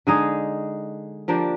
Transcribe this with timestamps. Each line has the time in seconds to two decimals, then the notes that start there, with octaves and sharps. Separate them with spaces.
0.07 D3 G#3 D#4 G#4
1.28 F3 A#3 D4 G4